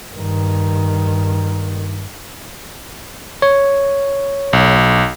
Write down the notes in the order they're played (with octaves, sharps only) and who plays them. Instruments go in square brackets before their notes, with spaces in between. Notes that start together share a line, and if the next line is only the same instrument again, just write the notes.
[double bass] G2 D#3
[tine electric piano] C#5
[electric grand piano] B1